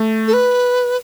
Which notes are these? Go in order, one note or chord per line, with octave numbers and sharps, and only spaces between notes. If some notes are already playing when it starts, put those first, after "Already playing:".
Already playing: A3
A4
B4